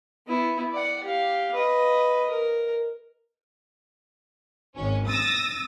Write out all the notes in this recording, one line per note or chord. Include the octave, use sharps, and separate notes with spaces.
B3 E4
D5 F#5
G4 F5
B4 D#5
A#4
G#1 C#4
D#6 E6 A6 A#6